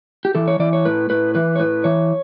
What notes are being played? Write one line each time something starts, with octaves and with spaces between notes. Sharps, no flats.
G4
E3 A4
C#5
E3 D5
C#5
A2 B4
A2 B4
E3 B4
C#5
A2 B4
E3 C#5